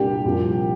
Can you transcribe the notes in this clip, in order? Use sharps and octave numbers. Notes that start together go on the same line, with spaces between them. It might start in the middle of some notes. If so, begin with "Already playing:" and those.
Already playing: C2 A#2 G3 D4 G4
C2 A#2 F3